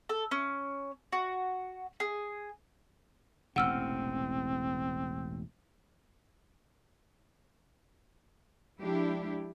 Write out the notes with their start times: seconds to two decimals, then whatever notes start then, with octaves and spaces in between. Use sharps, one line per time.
0.09 A4
0.31 C#4
1.13 F#4
2.00 G#4
3.56 E1 A1 C3 C4 F#5 E6 F6
8.79 F3 G#3 D4 E4 G4